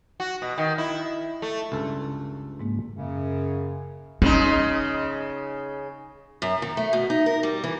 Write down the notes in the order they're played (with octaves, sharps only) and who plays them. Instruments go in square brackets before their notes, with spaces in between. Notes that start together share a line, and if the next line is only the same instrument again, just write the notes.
[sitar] F#4
B2
D#3
E4
A3
[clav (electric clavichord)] C#2 G2 A4
[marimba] G#2 G#3 A#3
[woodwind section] F#2 C#3
[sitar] C#3 G#3 D#4 [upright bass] C#4
[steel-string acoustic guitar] F#2
D#3
A3
B2
D#4
A#4
G3
E3